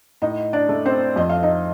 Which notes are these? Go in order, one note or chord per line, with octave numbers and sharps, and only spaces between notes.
A2 D#4 D#5
D4 D5
A3
C4 C5
F2 D#5
F5
D#4 D#5